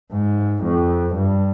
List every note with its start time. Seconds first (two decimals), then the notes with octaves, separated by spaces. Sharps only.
0.12 G#2
0.63 F2
1.14 G2